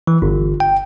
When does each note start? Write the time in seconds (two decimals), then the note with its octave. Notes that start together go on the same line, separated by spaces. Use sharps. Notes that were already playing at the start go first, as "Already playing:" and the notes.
0.07 E3
0.22 G1
0.60 G5